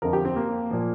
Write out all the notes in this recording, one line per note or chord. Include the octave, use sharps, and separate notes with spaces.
F2 D3 F3 A#4
G4
C4
A#3
A#2 F3